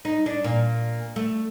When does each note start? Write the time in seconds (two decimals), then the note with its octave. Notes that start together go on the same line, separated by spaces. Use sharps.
0.05 D#4
0.26 D4
0.44 A#2
1.16 A3